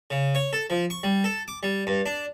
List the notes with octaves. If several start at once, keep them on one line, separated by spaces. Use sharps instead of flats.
C#3
C#5
A4
F3
C#6
G3
A4
D6
G3
G2
D4